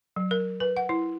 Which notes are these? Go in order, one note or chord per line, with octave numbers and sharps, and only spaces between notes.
F#3
A#4
B4
F#5
E4